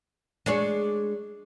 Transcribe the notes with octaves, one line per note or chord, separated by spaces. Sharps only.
G#3 D4 G#4 C#5